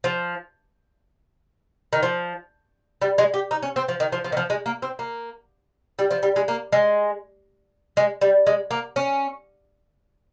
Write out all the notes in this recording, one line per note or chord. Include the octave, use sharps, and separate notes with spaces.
F3
D#3
F3
G3
G#3
G4
D#4
C#4
C4
F3
D#3
F3
F3
D#3
F3
G#3
A#3
C4
A#3
G3
F3
G3
G#3
A#3
G#3
G#3
G3
G#3
A#3
C#4